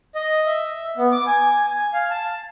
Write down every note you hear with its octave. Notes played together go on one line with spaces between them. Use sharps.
D#5
E5
B3
D6
G#5
G#5
F5
A5